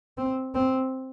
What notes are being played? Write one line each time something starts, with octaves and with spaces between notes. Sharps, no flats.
C4
C4